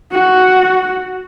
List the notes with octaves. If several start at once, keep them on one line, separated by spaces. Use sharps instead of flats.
F#4